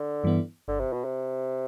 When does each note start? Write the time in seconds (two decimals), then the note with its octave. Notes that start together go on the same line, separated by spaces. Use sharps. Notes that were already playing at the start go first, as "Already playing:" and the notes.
Already playing: D3
0.24 G2 E3 B3 E4
0.68 G1 D3
0.80 C3
0.93 B2
1.04 C3